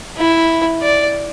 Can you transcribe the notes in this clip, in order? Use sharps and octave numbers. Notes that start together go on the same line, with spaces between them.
E4
D5